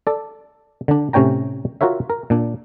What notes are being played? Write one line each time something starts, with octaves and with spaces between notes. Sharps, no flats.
A4 D5
D3 D4
A2 C3 C#4 C#5 G5 A#5
F4 F#4 A#4 C#5 E5
A#4
A#2 D4